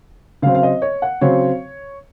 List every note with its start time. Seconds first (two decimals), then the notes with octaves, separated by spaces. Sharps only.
0.42 C#3 F5
0.46 F#3 C4
0.55 F5
0.63 D#5
0.82 C#5
1.02 F#5
1.21 C#3 F#3 C4 C#5